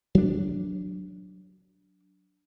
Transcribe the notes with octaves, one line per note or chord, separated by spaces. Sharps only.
F#3 D4